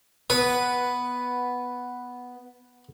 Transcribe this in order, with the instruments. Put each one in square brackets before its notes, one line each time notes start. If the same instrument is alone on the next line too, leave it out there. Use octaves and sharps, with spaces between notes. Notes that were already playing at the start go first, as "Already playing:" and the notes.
[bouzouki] B3 [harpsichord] B4